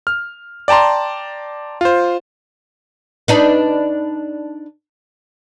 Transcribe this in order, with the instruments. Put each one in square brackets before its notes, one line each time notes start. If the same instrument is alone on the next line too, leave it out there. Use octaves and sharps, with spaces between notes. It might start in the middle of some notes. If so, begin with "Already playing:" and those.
[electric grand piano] F6
D5 G5 A5 A#5 C6
F4 C5
[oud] D4 D#4 B4